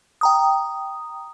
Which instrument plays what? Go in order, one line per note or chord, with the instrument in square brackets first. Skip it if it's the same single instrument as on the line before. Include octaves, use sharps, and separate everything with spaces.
[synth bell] G5 A#5 D#6